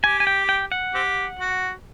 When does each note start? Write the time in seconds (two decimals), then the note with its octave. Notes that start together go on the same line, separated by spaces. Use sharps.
0.04 G4 G#5
0.20 G#5
0.27 G5
0.49 G5
0.72 F#5
0.94 C4 G4
1.39 F#4